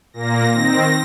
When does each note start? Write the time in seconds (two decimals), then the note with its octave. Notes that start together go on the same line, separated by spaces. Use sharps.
0.13 A#2 A#3 A#6
0.53 D#3 C4 A#6